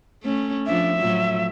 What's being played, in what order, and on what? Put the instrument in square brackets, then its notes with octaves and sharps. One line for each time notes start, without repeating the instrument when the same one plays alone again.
[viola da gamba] A3 C#4
[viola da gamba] F3 D4 [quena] E5
[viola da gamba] A2 F3 F#3